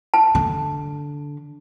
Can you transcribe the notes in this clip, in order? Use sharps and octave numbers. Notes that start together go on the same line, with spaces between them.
A5
D3